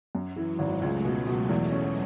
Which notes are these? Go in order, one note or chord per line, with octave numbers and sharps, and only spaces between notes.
F#2 F#3
E3
G#3
G#1
C#2 A3
B2
B2
E2
C#4